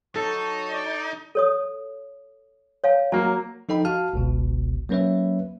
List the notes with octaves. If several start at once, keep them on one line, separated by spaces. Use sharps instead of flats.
F#3 D#4 A4 A5 C#6
D5
A4 C#5 D#6
C#5 F5 A5
F#3 A#3 A5
F3 D#4 A4 D#5 G5 B5
F#4 F5 A5 F6
G1 C#2 B2
F#3 A#3 C#4 B4 C#5 E5